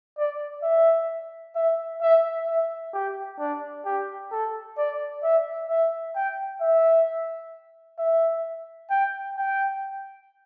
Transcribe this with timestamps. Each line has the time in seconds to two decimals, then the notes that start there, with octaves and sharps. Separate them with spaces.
0.18 D5
0.63 E5
1.55 E5
2.01 E5
2.47 E5
2.94 G4
3.39 D4
3.86 G4
4.31 A4
4.77 D5
5.23 E5
5.69 E5
6.15 G5
6.61 E5
7.98 E5
8.90 G5
9.37 G5